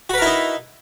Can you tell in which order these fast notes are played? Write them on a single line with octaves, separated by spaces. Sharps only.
F#4 B4 A#4 E4 D#4